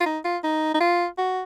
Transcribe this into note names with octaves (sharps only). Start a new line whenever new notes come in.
F4
D#4
F4
D#4
D#4
F4
F#4